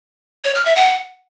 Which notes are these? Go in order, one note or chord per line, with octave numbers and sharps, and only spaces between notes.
C#5
F6
E5
F#5